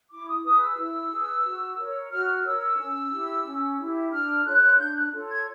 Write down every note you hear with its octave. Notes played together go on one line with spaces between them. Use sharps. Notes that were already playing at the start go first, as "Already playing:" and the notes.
E4 D6
D#6
G#4 B4 D#6
E6
E4
G#4
B4
F#4
A#4 C#5
F#4 F6
A#4 C#5 E6
C#4
E4 G4
C#4
E4 G4
D4 F6
F4 A4 C#5 F#6
D4 G6
F#6
F4 A4 C#5
G#6